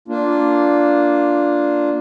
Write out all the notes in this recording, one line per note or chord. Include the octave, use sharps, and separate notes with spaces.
A#3 D4 F4